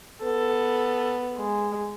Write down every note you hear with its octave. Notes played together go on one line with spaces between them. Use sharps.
B3 A4
G#3